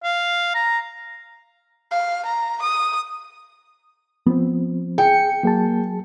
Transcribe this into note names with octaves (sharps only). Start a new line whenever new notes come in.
F5
A#5
F5
A#5
D#6
F3 B3 C4
G#4 G5 C#7
F#3 A#3 G#4 A5